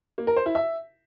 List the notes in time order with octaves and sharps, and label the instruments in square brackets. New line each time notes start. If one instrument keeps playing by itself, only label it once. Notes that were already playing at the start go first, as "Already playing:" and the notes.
[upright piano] A#3
A#4
C5
E4
E5